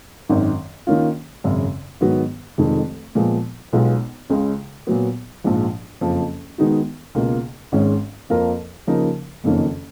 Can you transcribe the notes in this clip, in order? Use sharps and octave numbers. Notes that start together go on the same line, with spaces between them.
G#1 F#2 D#3
D#3 A#3 C#4 F4
G#1 F#2 C#3
G#2 D#3 F#3 B3 F#4
F1 F2 D#3 G#3
A#2 F3 G#3 B3
B1 B2 G#3 B3 F4
C#2 C#3 G#3
A#2 F#3 B3
A#1 G#2 F3
F#1 F2 F3
D#3 G#3 B3 D#4 F#4
C#2 B2 A#3 F4
G#1 G#2 D#3 G#3 C#4
F2 F3 A#3 F4 A#4
C#3 F3 A#3 D#4 A#4
F#1 F2 D#3 A#3 C#4